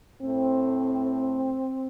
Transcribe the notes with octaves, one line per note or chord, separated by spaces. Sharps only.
A2 A3 C4